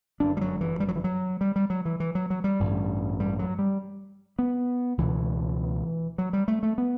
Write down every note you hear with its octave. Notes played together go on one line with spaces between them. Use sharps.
G1 F#2 D3 D4
G3
F#3
E3
G3
F#3
E3
F#3
G3
G3
F#3
E3
E3
F#3
F#3
G3
A1 G2 D3
G3
F#3
G3
B3
C#2 B2 E3
F#3
G3
A3
A3
B3